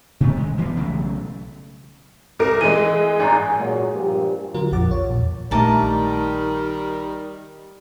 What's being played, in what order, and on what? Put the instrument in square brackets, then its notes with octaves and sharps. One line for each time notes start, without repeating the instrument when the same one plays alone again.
[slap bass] C3 D#3 A3 B3
G#3
D2 E3 A#3 B3
B1 C#3 F#3 A3
[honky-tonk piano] C2 A#4 D7
[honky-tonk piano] E3 G#3 [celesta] D#7
[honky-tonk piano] G#1 G#2 [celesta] G#5 A#5
[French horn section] A#2 F#3 G#3
G2 A#2 F3 G4
[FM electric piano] D3 F#3 F4 A#4
A#1 F2 F3 F#5 D6 A6
C#5
E2 A#2
[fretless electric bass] A#1 A3 [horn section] D#3 G3 [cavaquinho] D#4 A5 D6 [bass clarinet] A#4